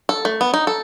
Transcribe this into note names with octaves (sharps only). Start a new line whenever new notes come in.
A4
A3
B3
D#4
A4